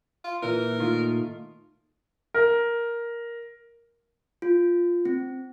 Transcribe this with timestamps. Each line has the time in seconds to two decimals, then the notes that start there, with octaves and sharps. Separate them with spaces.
0.24 F4
0.42 A#2 E3 A#4
0.79 D#3 A3 F4
2.34 A#4
4.42 F4
5.05 C4